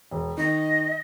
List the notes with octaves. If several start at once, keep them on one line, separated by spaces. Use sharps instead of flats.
E1
D#3 D#5